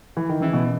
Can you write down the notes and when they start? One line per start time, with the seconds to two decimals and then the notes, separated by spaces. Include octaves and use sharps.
0.17 E3
0.29 D#3
0.41 C#3 E3
0.53 B2